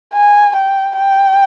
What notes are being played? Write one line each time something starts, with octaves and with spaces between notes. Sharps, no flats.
G#5
G5
G5